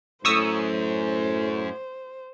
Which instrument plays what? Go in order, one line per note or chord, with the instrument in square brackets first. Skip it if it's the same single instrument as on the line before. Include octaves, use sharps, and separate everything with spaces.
[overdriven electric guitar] F#2 [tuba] A2 [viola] C5 [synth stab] C#6 D#6 E6